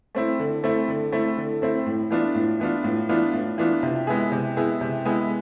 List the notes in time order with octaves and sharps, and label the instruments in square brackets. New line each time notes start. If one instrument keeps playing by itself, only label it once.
[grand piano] A3 C4 E4
D3
A3 C4 E4
D3
A3 C4 E4
D3
A3 C4 E4
A2
E3 B3 D4 F4
A2
E3 B3 D4 F4
A2
E3 B3 D4 F4
A2
E3 B3 D4 F4
C3
G#3 B3 E4 G#4
C3
G#3 B3 E4 G#4
C3
G#3 B3 E4 G#4